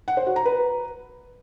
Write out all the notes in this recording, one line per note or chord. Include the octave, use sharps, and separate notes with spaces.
F#5
C5
F#4
A#5
B4